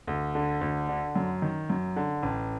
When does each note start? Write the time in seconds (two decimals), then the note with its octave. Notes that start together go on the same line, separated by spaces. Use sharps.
0.07 D2
0.35 D3
0.61 D2
0.89 D3
1.16 F#2
1.42 D#3
1.70 F#2
1.96 D3
2.23 A1